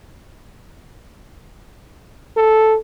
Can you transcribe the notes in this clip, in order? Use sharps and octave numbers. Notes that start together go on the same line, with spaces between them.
A4